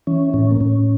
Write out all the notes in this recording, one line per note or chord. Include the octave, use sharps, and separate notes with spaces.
E3 C#4
A2 C#4
A#3
A2 C#4